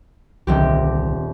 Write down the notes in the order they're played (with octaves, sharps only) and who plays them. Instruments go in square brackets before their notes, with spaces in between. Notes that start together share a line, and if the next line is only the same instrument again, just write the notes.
[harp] D#1 C4 G4 [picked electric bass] C2 D3